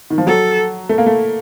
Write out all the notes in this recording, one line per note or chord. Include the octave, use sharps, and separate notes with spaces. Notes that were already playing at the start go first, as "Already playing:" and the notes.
D#3
F3
F#3 A4
A3
A#3
A3